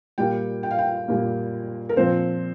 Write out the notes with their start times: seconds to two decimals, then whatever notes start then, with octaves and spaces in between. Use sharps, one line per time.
0.18 A#2 G3 A#3 G5
0.63 G5
0.71 F5
0.78 G5
1.08 A#2 G3 A#3
1.89 A#4
1.96 A#2 F3 C4 C5